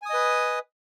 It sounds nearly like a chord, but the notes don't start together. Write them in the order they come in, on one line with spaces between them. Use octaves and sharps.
G#5 D#6 D#5 B4